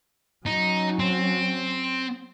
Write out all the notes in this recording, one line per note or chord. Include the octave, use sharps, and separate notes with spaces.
F#3 C#4 D#4
C4